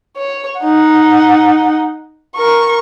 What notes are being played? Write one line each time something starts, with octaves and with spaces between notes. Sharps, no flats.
C#5
D#4 F#5
A#4 C#6